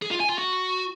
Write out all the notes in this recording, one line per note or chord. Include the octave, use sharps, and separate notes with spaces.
G#4
F4
G#5
F4
F#4